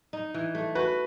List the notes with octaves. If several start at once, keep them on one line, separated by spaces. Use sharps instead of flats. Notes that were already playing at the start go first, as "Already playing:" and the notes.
D#4
E3
A3
F#4 B4